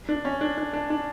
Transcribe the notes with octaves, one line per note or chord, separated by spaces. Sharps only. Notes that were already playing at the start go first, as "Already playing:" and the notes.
D4
C#4
D4
D4
D4
D4